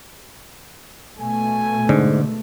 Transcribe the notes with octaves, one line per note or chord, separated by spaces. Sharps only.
B2 A3 G#5
G#2 D3